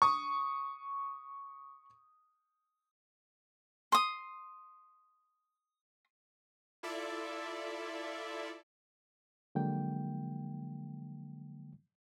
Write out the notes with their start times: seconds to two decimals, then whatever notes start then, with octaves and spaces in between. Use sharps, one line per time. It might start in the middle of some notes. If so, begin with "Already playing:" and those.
0.02 C#6 D#6
3.92 C6 D#6
6.83 E4 F4 A4 D5 E5
9.55 D3 F3 F#3 G#3 A#3 G5